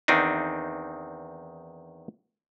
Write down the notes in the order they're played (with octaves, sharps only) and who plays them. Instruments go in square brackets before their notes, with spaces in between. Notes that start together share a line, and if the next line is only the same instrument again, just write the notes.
[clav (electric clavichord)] E2 D#3 C4 D4 D#4